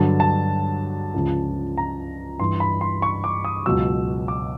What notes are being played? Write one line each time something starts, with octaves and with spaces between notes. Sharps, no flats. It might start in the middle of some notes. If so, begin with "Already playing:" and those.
Already playing: G2 D3 F#3 A5
A5
C#2 C#3 F3
A#5
G2 E3 C6
B5
C6
C#6
D6
D#6
C#2 B2 F#3 E6
D6